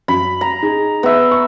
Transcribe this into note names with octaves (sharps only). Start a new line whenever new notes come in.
F#2 B5
A#5
D#4 G#4
B3 E5
C#6